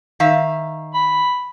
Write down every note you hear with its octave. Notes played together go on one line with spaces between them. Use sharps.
D#3 E5 F5
B5